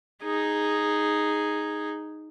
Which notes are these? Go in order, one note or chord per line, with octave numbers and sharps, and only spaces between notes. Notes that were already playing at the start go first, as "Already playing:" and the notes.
D#4 G#4